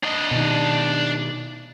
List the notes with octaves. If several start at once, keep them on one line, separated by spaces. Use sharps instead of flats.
D4 D#5
B2 D#3